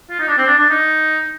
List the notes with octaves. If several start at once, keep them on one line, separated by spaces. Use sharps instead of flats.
F4
D#4
D4
C4
D4
D4
D#4